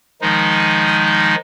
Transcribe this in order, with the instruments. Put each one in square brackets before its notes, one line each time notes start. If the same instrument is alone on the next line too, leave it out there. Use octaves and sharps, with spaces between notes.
[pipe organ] D#3 F3 G#3 D#4